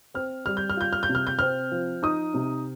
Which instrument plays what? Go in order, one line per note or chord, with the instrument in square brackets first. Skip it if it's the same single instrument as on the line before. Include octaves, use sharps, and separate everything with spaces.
[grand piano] C4 [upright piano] F6
[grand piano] G3 [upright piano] F6
[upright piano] G6
F6
[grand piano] F4 [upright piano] G6
[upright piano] F6
G6
[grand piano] C3
[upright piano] F6
G6
[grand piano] C4 [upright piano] F6
[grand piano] F3
[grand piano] D#4 [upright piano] D#6
[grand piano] C3